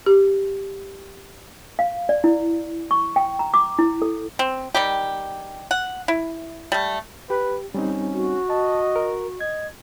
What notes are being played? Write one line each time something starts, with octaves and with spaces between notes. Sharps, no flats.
G4
F5
D5
E4
C#6
G5
A#5
D6
E4
A4
C4
D#3 G3 G4
F#5
E4
G3 A3
G4 B4
G3 C4 C#4 D#4
F#4
D#5 A5
A#4
D#5 G#6